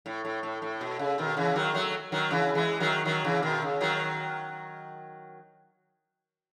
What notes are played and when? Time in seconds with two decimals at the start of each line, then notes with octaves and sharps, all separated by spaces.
0.06 A2
0.25 A2
0.43 A2
0.62 A2
0.81 B2
0.99 C#3
1.18 B2 D#3
1.37 C#3 E3
1.56 D#3 F#3
1.75 F#3 A3
2.12 D#3 F#3
2.31 C#3 E3
2.55 E3 G#3
2.80 D#3 F#3
3.05 D#3 F#3
3.25 C#3 E3
3.42 B2 D#3
3.62 C#3
3.80 D#3 F#3